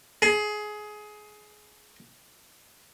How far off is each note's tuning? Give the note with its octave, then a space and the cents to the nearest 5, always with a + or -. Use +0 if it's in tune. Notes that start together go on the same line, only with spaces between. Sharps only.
G#4 +20